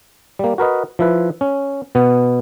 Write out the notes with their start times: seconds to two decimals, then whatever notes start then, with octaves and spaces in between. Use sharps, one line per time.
0.39 G3 A#3
0.58 F#4 A#4 B4 D#5
0.99 F3 E4 B4
1.41 C#4
1.95 B2 B3